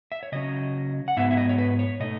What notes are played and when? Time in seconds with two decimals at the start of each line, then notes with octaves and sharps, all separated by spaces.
0.12 E5
0.23 C#5
0.32 C#3 F#3 C#4 D#5
1.08 F#5
1.17 G#2 F#3 B3 E5
1.31 E5
1.37 D#5
1.49 C#5
1.58 B4
1.79 C#5
2.00 B2 A3 D#4 D#5